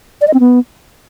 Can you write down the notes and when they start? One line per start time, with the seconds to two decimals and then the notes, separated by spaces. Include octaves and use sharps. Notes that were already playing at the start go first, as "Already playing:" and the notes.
0.21 D5
0.27 D#5
0.34 C4
0.40 B3